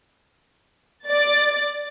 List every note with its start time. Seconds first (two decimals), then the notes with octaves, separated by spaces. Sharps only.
1.07 D5 A6